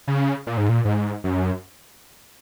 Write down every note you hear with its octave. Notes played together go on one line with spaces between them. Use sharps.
C#3
A#2
G#2
A#2
G#2
F#2